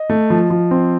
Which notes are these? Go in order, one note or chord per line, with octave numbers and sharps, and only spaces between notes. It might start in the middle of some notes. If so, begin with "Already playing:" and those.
Already playing: D#5
A3
F3
F3
C4